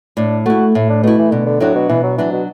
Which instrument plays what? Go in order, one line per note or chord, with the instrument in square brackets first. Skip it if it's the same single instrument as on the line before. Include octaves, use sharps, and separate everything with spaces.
[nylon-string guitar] A2 [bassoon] D4
[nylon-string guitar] A3 E4 [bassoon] F#4
[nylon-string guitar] A2 [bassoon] E4
[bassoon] D4
[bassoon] B2 [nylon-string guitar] A3 E4
[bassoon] E3
[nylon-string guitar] B2 [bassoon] D3
[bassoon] D3
[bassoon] A2 [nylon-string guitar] F#3 D4 F#4
[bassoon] B2
[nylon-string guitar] B2 [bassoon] E3
[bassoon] F#3
[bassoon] E3 [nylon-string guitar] F#3 D4 F#4
[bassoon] B2